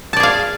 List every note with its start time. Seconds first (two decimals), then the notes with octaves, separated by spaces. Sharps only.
0.13 A5
0.16 D5
0.20 G#4
0.23 F5